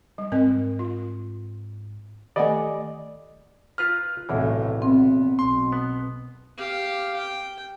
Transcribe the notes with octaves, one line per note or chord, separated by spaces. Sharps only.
G3
G#2 C4 A#4 D#5
F4
D#3 A3 G4 D5 D#5 F#5 G#5
F4 B4 A#5 F6
B1 E2 A2 C3 E3
B3 C4
B1 C6
B3
G4 F5
G5